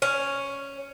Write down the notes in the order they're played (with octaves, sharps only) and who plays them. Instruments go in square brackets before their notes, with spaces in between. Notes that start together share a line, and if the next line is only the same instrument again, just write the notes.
[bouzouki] C#4